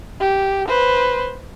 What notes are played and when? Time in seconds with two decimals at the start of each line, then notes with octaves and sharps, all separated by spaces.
0.20 G4
0.68 B4 C5